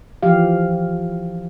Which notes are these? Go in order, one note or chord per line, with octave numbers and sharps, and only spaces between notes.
E3 F3 G4 F5